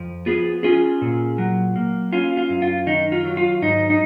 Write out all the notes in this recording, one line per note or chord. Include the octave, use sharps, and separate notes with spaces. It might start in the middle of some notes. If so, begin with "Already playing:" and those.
Already playing: F2 F3
B3 F4 G#4
C#4 F4 G#4
A#2
F#3
A#3
C#4 F4
F4
F#2
F4
D#3 D#4
F4
F#3
F4
G#2 D#4
D#4